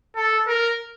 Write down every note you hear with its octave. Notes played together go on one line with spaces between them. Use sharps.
A4
A#4